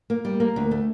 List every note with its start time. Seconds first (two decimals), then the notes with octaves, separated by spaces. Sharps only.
0.10 A#3
0.25 G3
0.40 A#3
0.56 D2
0.71 A3